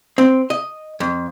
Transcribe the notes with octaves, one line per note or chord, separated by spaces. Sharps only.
C4
D#5
F2